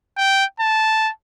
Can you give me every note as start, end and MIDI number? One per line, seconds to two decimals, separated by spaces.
0.17 0.45 79
0.60 1.10 81